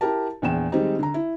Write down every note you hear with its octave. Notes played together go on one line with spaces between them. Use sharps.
E4 G4 A#4 A5
A#1 E2 G5 E7
D#3 G3 G#3 C4 D#4
D3 A#5
E4